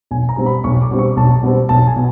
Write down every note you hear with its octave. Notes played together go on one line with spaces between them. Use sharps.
B1 G#5
A#5
B2 G3 C4
B5
B1 C#6
D6
B2 G3 C4
C#6
B1 A5
B2 G3 C4
B1 A5
G#5
B2